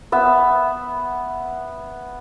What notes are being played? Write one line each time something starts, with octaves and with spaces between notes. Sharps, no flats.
B3 E5